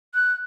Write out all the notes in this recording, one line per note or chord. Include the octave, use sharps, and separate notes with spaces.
F#6